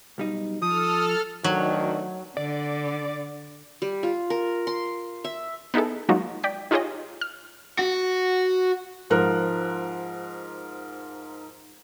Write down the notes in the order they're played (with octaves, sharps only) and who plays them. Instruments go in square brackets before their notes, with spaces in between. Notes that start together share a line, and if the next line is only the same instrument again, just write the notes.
[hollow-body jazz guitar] B1 G3 D#4
[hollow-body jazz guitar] F3 [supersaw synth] A4 F6 [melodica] D#6
[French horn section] D2 D3 D#3 [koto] F#3
[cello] D3 [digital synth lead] D5
[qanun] G3
F4
A#4
C6
E5
[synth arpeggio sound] B3 D#4 E4 G#4 A4
F#3 G#3 A#3 D#4 F4 F#4
D5 G5 B6
D#4 F4 G4 G#4 C#5 D#5
F6
[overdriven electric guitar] F#4
[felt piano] G#2 F3 A#4 F#6